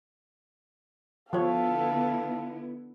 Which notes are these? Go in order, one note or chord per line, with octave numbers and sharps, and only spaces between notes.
D3 F3 B3 E4 A4 C#5 F5